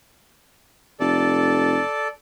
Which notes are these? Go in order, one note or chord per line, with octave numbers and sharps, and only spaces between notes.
F1 A4 D5